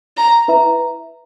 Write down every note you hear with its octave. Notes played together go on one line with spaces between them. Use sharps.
A#5
E4 B4 E5 A#5